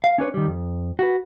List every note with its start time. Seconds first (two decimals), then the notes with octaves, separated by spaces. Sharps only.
0.04 F5
0.18 C#4 D4 B4 C#5
0.34 D#3 G3
0.47 F2
0.99 F#4 B4